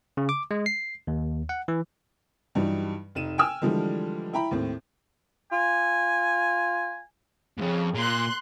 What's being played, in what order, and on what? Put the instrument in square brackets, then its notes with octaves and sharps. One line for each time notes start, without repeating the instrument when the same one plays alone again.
[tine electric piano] C#3
D6
G#3
C7
D#2
F#5
E3
[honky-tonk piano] G2 E3 F#3 G3 D#4
F1 D#4 D#7 E7
G5 G#5 E6 F6
D3 E3 F3 G3 G#3
E4 G5 A#5 B5
D#2 A2 C4
[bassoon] F4 [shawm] G#5
[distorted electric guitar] F2 G#2 [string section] C#3
[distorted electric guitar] A#2 [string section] C6 F#6